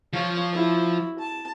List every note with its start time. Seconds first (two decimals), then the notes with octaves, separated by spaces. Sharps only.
0.13 F3 F4 C#5 F5
0.53 E4 F#4
1.18 A5